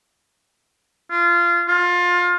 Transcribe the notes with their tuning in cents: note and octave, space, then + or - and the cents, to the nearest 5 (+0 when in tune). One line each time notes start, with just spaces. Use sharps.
F4 -20
F4 +25